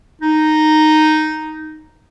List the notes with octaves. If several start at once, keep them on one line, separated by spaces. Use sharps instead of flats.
D#4